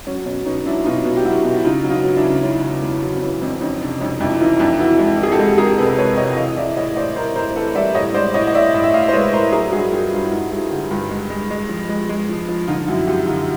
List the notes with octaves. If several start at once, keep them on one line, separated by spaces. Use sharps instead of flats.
F#3 C#4
B2 C#4
B2 C#4 D#4
F#3 D4 E4
B2 D#4 F4
B2
G4
F#3 E4 F#4
B2
E4
C#3 D#4 F4
F#3
D#4 F4
F#3
D#4
D4 E4
C#3
E2 C#4 D#4
C#3
E2
F#3
C4
E3 C#4
F2 C4 D4
F2 C#4 D#4
C3 C4 D4
F2 C#4 D#4
F2 D4 E4
E4
E3 D#4 F4
F2 D4 E4
E3 E4 F#4
G#3
E3 G#4
G4 A4
G#3
G#3 G#4 A#4
C3 A4 B4
G#3 B4 C#5
C3 C#5 D#5
E3 D#5 F5
E3 D5 E5
A2 C#5 D#5
A2 C5 D5
A2 A#4 C5
A2 A#4 C5
E3 A4 B4
G3 D5 E5
A2 C#5 D#5
G#3 C5 D5
A2 C#5 D#5
D#5
A2 D5 E5
A2
E5
A2 D#5 F5
C5
G#3 B4 C#5
A2 A#4 C5
F#3 G#4 A#4
G2 F#4 G#4
F#3 F4 G4
G2 F4 G4
E4
G2 D#4 F4
G2 E4 F#4
D3 F4 G4
G2 F4 G4
G#3
G#3
G#3
F3
G#3
G#3
F3
F3
D3 D#4 F4
F#2 E4 F#4
F#2 F4 G4
D3 D#4 F4